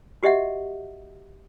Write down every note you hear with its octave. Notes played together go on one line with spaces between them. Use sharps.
F#4 G4 D#5 E5 F#5